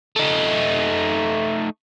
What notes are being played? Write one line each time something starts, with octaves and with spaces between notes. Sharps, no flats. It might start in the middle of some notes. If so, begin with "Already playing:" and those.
A3 D#4